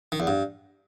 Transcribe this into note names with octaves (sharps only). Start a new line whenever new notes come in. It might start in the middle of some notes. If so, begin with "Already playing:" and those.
D#3
E2
G2